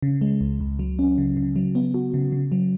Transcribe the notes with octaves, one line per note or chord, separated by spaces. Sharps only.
C#3
G#3
C#2
C#2
F#3
C#4
C#3
C#3
F#3
B3
F#4
C#3
C#3
F#3